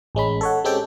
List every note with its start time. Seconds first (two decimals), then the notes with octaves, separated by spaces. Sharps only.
0.15 A1 G#3 C#4 B5
0.41 A4 C#5 F#5
0.64 G#3 C4 C#4 G4 A4 G5